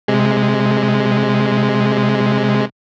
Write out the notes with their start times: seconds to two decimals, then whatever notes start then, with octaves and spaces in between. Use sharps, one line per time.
0.08 C3 G#3